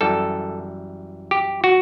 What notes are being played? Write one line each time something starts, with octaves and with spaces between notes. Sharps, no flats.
F#2 E3 G3 A4
G4
F#4